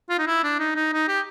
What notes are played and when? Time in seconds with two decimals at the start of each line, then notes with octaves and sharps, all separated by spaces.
0.10 F4
0.19 D#4
0.27 E4
0.43 D4
0.59 D#4
0.76 D#4
0.93 D#4
1.08 G4